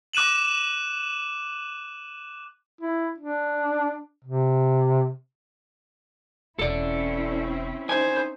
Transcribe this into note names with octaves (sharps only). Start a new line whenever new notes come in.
D6 F#6 D#7 E7 F#7
E4
D4
C3
E1 C4 C#4 E4 A4 D5
D#4 C5 G#5